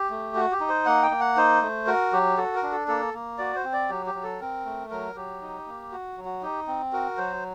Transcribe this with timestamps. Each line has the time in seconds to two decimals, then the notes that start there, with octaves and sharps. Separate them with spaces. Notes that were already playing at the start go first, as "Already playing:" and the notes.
Already playing: G4
0.10 A3
0.35 F#4
0.52 G4
0.60 D#4
0.69 C5
0.86 A#3 F#5
1.03 G5
1.11 A#3
1.20 F#5
1.36 D#4 C5
1.62 A3
1.87 F#4 A#4
2.12 F#3 G4
2.37 F#4 A4
2.55 A#4
2.63 D4
2.72 A4
2.88 A#3 A4
3.14 A#3
3.38 F#4 D5
3.56 C5
3.64 C4
3.73 D5
3.89 F#3 G4
4.06 G4
4.15 F#3
4.23 A4
4.40 C4 A#4
4.65 A3
4.90 F#3 A#4
5.15 F#3 G4
5.42 D#4
5.67 A#3
5.92 F#4
6.17 F#3
6.25 F#4
6.42 D#4 G4
6.67 C4
6.93 F#4 A#4
7.17 F#3 C5